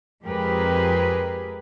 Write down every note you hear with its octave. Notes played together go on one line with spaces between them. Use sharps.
F2 G#3 G4 G#4 A#4 B4